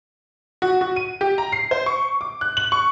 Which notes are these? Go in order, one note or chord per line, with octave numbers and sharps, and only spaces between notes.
F#4
F#4
D#7
G4
A#5
C7
C5
C#6
D6
F#6
F#7
C#6